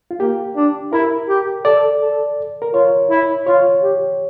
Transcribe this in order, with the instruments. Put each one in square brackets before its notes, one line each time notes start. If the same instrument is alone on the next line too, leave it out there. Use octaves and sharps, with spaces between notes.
[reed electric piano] F4
[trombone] A#3 [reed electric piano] G4
[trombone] D4
[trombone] E4 [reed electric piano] A#4
[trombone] G4
[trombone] A4 [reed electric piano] D5
[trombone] A4
[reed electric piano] A#4
[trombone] F4 [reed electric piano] C#5
[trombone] E4
[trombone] F4 [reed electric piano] C#5
[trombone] G4